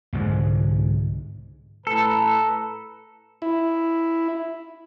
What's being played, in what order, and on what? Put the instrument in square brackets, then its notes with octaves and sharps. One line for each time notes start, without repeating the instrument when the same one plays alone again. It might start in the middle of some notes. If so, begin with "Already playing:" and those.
[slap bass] C2 G#2 D3 G#3
[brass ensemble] A2 B4 A#5 [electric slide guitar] A4
[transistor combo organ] E4